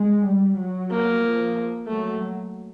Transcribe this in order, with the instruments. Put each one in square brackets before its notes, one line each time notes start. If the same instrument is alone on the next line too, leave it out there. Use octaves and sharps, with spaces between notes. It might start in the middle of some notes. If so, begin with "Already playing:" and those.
Already playing: [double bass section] G#3
G3
F#3
[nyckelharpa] A#3
[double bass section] F3
[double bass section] F#3 [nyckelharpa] A3